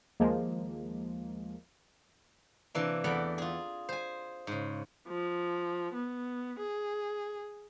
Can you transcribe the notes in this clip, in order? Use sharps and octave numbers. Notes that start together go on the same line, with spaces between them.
D#2 F3 G#3 A#3
C3 E3 A#3 D4
E2 A3 A#4 D5 F#5 B5
F4 G#4
C5 G#5
G#2 C#3
F3
B3
G#4